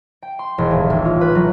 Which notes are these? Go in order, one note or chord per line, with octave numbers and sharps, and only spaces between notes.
G5
C6
E1
D#1
A1
F4
B4
F#3